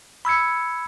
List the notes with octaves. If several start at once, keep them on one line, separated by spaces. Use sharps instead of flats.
B5 E6 G#6 C#7